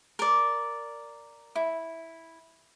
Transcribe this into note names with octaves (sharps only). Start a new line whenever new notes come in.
A#4 D5
E4